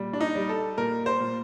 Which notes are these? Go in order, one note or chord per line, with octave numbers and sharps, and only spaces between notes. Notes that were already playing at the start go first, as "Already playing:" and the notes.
Already playing: A#2 G3
D4
D#4
G3
A4
A#2 A#4
C5
A#2